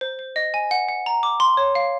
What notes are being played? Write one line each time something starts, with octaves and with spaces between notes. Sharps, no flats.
C5
C5
D#5
G#5
F#5
F#5
A#5
D6
C6
C#5
F5